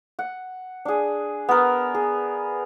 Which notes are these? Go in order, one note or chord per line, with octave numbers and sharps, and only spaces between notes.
F#5
D4 G#4
B3 A#4
G#4